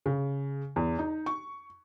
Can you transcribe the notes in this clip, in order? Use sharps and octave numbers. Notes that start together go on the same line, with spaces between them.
C#3
E2
D#4
C#6